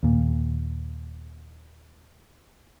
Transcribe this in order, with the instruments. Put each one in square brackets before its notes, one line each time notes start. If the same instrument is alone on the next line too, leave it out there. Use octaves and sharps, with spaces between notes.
[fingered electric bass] D#2 A#2